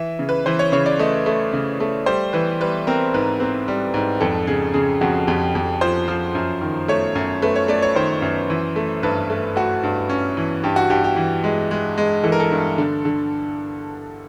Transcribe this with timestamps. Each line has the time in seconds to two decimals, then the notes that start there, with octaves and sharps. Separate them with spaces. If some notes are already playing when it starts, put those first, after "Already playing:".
Already playing: E3 E5
0.19 C#3
0.29 B4
0.46 E3 C5
0.59 C#5
0.72 C#3 C#5
0.86 D5
0.99 A3 D#5
1.26 A3
1.53 C#3
1.80 A3
2.06 G3 C5
2.33 E3 B4
2.61 G3 B4
2.87 C4 A#4
3.14 G#2 B4
3.40 C4
3.68 G3
3.94 G#2
4.20 F2 A4
4.47 C#3 G#4
4.74 C#3 G#4
5.01 F2 F#4
5.27 F2 G4
5.55 F2
5.81 F3 C5
6.08 F3
6.35 F#2
6.61 D#3
6.88 A3 C#5
7.15 F#2
7.42 A3 B4
7.56 C#5
7.68 A3 D5
7.82 C#5
7.95 D#3 C5
8.22 F#2
8.50 E3
8.76 A3
9.03 G2 B4
9.30 A3
9.56 A3 F#4
9.83 G2
10.09 C#4
10.37 E3
10.63 G2 G4
10.76 F#4
10.90 G2 G4
11.04 G4
11.16 E3
11.44 G#3
11.71 G#3
11.98 G#3
12.23 E3 A4
12.32 A#4
12.40 A4
12.51 G2
12.78 D3
13.05 D3